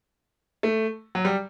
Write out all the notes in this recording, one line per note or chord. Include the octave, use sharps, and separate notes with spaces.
A3
F#3
G3